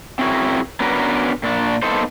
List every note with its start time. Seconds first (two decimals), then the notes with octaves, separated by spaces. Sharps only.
0.19 C4 C#4 E4 F#4 G#4 A#4
0.80 B3 C#4 D4 F#4 A#4 B4
1.43 A#2 D4
1.82 A#3 B3 D#4 A4 C5